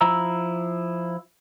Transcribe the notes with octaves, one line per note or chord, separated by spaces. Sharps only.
F3 E4 A#5 E6